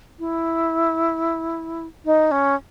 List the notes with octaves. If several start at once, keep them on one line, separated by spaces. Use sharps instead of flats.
E4
D#4
C#4